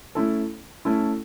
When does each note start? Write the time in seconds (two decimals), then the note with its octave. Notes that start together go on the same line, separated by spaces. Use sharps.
0.15 A3 C#4 E4 A4
0.85 A3 C#4 E4 A4